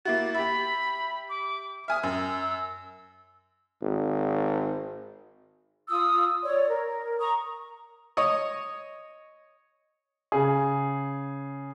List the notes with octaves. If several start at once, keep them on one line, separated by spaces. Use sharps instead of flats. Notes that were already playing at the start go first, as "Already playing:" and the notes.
A#3 E4 F#4 A6
G4 E5 B5
D6
E5 G#5 D#6 F6
F#2 E6
G#1
F4 D#6 E6
C#5 D5
A#4
A#5 C#6 D#6
C#5 D#5
C#3 G#4